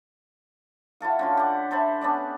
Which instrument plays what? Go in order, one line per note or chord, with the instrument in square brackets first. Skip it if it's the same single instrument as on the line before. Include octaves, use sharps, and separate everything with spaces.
[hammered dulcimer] E4 F#4 A4 F5
D3 C#4 F4
G4 F#5
A4 C5 E5 B5
B3 C#4 D4 D5